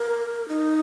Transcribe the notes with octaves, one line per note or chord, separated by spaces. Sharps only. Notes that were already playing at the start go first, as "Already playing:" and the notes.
Already playing: A#4
D#4